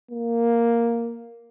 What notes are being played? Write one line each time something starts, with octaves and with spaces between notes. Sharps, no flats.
A#3